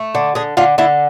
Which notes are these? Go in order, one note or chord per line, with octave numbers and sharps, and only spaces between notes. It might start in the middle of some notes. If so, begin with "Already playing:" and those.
Already playing: A3
D3
D3 G#4
D3 F4
D3 E4